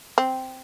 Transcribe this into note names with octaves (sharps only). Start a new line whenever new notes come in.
C4